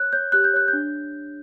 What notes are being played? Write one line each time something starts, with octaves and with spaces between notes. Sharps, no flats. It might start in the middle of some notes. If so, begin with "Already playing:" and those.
Already playing: C#5 F#6
C#5 G6
G4 F#6
G6
C#5 F#6
G6
D4